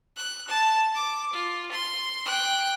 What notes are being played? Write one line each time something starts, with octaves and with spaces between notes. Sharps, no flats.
F#6
A5
D6
F4
C6
G5 F#6